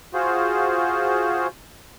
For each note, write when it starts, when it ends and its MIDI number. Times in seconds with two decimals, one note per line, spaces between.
0.14 1.47 65
0.14 1.47 66
0.14 1.47 68
0.14 1.47 72